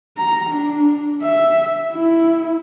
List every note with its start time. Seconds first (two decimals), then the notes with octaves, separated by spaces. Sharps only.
0.17 A#5
0.49 D4
1.22 E5
1.93 E4